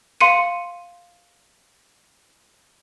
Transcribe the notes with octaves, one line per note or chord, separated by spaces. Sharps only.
F5 C6 C#7 D#7